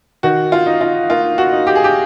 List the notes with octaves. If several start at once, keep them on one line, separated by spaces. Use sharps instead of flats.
D#3 F#4
F4
D#4
F4
A#3 F4
F#4
D#4
G4
G#4
G4